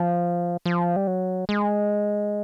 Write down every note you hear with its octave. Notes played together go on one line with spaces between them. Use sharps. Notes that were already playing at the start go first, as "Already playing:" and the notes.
Already playing: F3
F3
G3
F#3
G#3